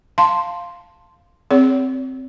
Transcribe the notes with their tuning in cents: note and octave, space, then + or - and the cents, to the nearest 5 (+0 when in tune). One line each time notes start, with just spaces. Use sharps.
F5 +0 A5 +15 C6 +0
C4 +0 G#4 +0 C#5 +30